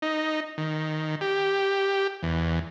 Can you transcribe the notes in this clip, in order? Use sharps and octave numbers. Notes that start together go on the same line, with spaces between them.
D#4
D#3
G4
E2